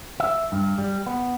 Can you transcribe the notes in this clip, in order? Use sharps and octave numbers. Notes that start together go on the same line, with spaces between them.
E5
G2
G3
B3